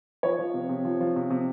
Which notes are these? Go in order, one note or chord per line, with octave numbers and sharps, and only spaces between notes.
F3 C#5
F3
C3
C3
F3
F3
C3
C3